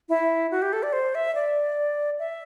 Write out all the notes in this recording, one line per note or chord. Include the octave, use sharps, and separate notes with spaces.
E4
F#4
G4
A4
D5
C5
E5
D5
E5